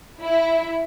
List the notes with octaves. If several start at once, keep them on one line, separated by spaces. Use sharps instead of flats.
E4